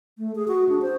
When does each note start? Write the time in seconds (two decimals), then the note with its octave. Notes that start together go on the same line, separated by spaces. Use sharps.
0.18 A3
0.36 G#4
0.48 F#4
0.69 D4
0.82 C5